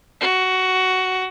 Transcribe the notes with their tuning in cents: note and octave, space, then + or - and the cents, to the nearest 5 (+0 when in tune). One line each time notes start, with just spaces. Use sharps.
F#4 +10